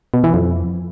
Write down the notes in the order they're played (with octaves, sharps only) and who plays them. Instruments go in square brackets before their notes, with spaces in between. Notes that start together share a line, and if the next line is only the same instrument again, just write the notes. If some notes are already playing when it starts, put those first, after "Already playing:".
[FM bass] B2
E3
F2